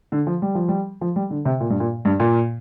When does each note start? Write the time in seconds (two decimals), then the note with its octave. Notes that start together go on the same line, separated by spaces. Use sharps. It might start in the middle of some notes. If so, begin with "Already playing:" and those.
0.12 D3
0.27 F3
0.42 G3
0.55 F3
0.68 G3
1.01 F3
1.16 G3
1.30 D3
1.45 C3
1.60 A#2
1.70 G2
1.80 A#2
2.05 G2
2.20 A#2